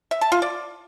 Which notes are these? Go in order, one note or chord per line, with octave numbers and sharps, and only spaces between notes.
E5
A5
F4
D5